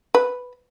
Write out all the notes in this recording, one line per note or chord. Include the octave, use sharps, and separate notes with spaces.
B4